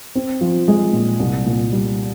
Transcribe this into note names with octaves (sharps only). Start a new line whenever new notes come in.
C4
F3
G#3
A#2
C2
A#2
G3